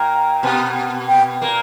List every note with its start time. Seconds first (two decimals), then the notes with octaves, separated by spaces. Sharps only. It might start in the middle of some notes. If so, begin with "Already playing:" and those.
Already playing: A#2 A#3 G5
0.43 B2 B3
1.08 G5
1.41 A#2 A#3